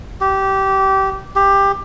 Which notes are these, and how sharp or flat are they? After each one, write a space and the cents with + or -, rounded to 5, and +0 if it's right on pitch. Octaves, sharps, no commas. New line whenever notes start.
G4 -20
G4 +15